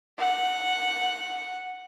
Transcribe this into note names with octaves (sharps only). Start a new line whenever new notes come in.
F#5